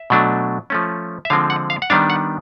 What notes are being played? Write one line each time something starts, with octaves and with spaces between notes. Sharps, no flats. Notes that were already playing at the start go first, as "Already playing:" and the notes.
Already playing: E5
B2 F#3 A3 D4
F3 A3 C#4
E5
D3 F3 G#3 C4 F5
F#5
F5
F#5
D#3 G3 B3 D4 F5
F#5